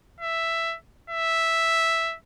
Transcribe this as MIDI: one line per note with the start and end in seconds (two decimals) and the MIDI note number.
0.21 0.76 76
1.10 2.16 76